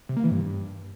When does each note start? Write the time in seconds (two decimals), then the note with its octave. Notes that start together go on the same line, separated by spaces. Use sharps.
0.09 C3
0.16 A#3
0.24 E3
0.31 G2